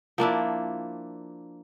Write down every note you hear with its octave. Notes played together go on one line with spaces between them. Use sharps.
F3 A#3 D4 E4